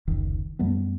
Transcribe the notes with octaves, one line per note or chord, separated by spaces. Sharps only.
F1 C#2 D#3
F#2 G3 A3 B3